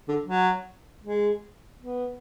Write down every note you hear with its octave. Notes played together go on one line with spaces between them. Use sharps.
D3
F#3
G#3
B3